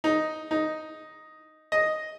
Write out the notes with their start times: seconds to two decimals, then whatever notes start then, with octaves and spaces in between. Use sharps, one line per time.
0.04 D#4
0.51 D#4
1.72 D#5